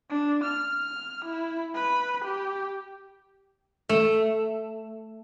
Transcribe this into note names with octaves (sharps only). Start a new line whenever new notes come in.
D4
F6
F6
E4
B4
G4
A3